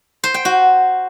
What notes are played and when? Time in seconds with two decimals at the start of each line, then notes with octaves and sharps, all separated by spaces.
0.24 C5
0.34 G5
0.45 F#4